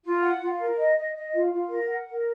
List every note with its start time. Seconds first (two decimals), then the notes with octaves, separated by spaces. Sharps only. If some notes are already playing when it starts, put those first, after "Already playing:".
0.04 F4
0.22 F#5
0.40 F4
0.58 A#4
0.77 D#5
0.96 D#5
1.15 D#5
1.33 F4
1.51 F4
1.69 A#4
1.88 F#5
2.07 A#4